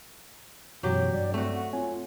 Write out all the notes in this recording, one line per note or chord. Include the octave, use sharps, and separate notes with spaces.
F#2 B2 E3 F#3 F#4 G4
G2 G3 D5
A3 C4 F#4
F#5
C4 F4 C#5 G#5